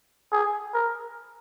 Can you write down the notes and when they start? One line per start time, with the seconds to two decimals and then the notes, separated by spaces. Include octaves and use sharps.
0.32 G#4
0.74 A#4